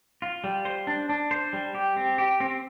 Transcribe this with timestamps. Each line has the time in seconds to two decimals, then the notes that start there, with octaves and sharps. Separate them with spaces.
0.22 F4
0.44 G3
0.65 C5
0.87 D4
1.09 D4
1.31 C5
1.53 G3
1.75 G4
1.96 C4
2.18 G4
2.40 C4